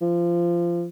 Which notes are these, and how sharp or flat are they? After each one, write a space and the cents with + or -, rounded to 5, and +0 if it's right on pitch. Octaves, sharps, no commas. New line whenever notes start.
F3 -20